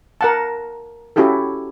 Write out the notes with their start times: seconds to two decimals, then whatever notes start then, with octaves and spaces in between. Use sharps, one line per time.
0.21 A#4 F#5 A5
1.16 C#4 E4 F#4 G4 A4